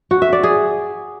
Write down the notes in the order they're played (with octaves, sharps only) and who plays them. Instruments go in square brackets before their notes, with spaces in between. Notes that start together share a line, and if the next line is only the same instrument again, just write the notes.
[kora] F#4
E5
D5
G#4